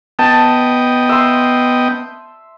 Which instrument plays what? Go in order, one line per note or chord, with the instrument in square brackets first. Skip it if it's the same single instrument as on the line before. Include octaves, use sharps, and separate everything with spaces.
[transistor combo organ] B3 D#5 G5 [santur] A5
[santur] E5 C6